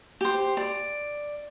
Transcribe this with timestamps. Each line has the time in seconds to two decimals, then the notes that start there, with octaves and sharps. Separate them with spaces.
0.21 G4 C5
0.57 D5